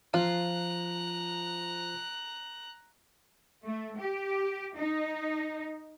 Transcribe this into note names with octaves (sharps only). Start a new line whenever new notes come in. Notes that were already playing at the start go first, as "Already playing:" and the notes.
F3 F4 A#5 F#6
A3
G4
D#4